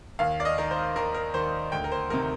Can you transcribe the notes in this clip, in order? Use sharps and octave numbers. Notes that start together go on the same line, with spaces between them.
D#2 F5
D5
D#5
D#3 A#4
C5
D#2 A#4
A#4
D#3 C5
D2 G5
A#4
C5
C3 D#3 A#4